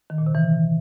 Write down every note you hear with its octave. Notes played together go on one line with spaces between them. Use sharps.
D#3
A#2
C3
E3